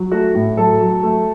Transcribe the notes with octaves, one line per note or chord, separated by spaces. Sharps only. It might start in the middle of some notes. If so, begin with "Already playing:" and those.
Already playing: F#3
A3 F#4
A2
F#3 A4
F#3
A3